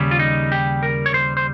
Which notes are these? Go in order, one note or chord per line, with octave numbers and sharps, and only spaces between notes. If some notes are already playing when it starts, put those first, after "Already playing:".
Already playing: D#2 C#3 G3
F4
D#4
G4
A#4
C#5
C5
C5